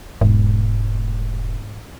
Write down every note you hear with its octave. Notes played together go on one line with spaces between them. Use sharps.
E1 G#2